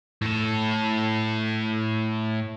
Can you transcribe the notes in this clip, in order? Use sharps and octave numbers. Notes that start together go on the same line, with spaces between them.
A2 A4